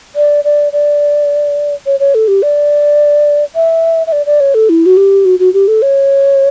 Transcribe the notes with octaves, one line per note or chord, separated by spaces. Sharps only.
D5
D5
D5
C#5
C#5
A4
G4
D5
E5
E5
D5
D5
C#5
A4
E4
F#4
G4
F#4
F#4
G4
A4
C#5